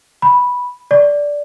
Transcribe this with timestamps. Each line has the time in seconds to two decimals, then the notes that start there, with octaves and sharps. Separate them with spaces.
0.22 B5
0.91 D5